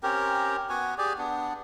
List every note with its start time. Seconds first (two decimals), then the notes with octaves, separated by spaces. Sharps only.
0.03 C4 C#4 G4 A#4
0.69 B3 F#4 G#5
0.98 G4 G#4 D5
1.18 B3 D4